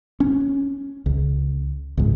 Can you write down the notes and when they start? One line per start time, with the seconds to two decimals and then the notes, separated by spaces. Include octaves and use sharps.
0.20 C#4
1.06 C#2
1.97 C#2 G#2